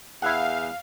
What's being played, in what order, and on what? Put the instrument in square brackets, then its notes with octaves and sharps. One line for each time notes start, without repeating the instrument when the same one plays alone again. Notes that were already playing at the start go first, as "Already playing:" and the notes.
[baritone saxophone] E2 [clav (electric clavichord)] E4 F#5 [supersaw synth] F5